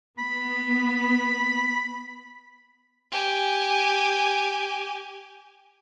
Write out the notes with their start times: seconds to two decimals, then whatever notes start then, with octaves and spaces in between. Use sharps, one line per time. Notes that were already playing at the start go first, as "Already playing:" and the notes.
0.18 B3 B5
3.12 G4 G#5